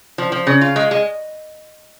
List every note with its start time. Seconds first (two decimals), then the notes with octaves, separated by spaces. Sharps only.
0.18 F3
0.32 F3
0.47 C#3
0.61 F4
0.76 G#3
0.91 G#3